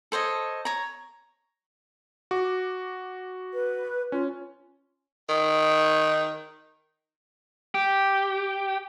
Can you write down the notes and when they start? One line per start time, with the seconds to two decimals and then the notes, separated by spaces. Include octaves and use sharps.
0.12 A4 C5 C#5 D#5
0.65 C#5 A#5
2.31 F#4 D6
3.53 B4
4.12 C#4 F4
5.29 D#3
7.74 G4